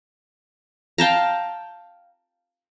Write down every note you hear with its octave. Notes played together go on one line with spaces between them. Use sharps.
F5 G5 A5 A#5